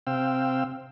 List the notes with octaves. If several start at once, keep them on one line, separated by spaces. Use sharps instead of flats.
C3 C4 F5 G5 E6